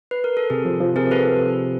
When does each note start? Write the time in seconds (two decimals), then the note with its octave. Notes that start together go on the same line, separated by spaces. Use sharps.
0.11 B4
0.24 A#4
0.37 A4
0.50 C3 G#4
0.65 F3
0.81 F3
0.95 C3 G#4 A#4
1.11 A4 B4